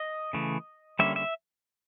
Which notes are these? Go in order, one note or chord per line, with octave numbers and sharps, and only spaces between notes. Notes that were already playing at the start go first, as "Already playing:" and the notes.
Already playing: D#5
C#3 E3 A3
D3 G3 A#3 C#4 E5
E5